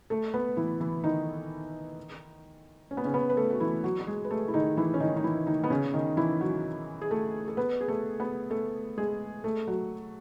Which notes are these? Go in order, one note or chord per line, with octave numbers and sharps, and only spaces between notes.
A3 A4
B3 B4
E3 E4
E3 E4
D#3 D#4
C#4
B3
C#3 C#4
B3 B4
B4
A3 A4
F#4
E3 E4
F#3 F#4
F#4
G#3 G#4
B4
A3 A4
E4
D#3 D#4
E3 E4
C#4
D#3 D#4
D#4
E3 E4
D#3 D#4
B3
C#3 C#4
D#3 D#4
E3 E4
F#3 F#4
G#4
A3 A4
A4
B3 B4
G#4
A3 A4
B3 B4
A3 A4
G#3 G#4
A3 A4
F#3 F#4